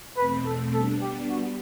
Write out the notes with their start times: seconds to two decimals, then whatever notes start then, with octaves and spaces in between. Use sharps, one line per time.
0.17 E2 B2 A3 C4 B4
0.45 A4
0.74 G3 B3 D4 A4
1.02 G4
1.29 G3 B3 F#4